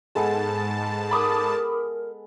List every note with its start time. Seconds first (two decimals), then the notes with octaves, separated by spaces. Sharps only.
0.15 G#2 G#3 B3 A4 A5
1.11 A#4 B5 D6 D#6